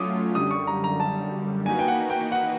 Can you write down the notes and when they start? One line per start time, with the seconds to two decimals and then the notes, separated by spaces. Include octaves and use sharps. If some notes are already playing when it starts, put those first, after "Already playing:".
Already playing: F#3 A3 C#4 F4 D6 D#6
0.34 F#2 D3 G3 D#6
0.51 C#6
0.67 A#5
0.84 A#5
1.00 A5
1.66 A#3 D#4 F#4 B4 G#5
1.79 G5
1.88 F#5
2.10 G5
2.32 F#5